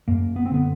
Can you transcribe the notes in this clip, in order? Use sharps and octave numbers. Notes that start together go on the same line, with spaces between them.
F#2 A#3
B3
C4
D3 B3